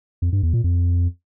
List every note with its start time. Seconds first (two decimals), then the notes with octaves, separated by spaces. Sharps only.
0.22 F2
0.32 G2
0.43 E2
0.53 A#2
0.64 F2